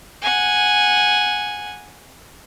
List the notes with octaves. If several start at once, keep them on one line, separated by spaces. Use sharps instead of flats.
F#5 G#5